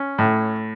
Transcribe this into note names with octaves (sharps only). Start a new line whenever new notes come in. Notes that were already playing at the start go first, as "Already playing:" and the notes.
Already playing: C#4
A2